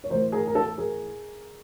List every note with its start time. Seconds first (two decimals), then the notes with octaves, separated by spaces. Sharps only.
0.04 C#5
0.10 A2 E3 A#4 C5
0.32 G#4 A#4
0.47 A#4
0.55 A4
0.78 G#4 A#4